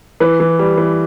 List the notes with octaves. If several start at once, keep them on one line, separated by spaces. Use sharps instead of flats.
E3 B4
E3
G3
E3